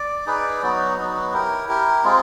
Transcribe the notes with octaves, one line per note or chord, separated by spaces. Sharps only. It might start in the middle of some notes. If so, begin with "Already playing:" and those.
Already playing: D5
D#4 G#4 B4 D5
F#3 B3 D#4 F#4
F#3 B3 D#4 F#4
E4 G4 A#4
E4 G4 A#4
G#3 C4 F4 G#4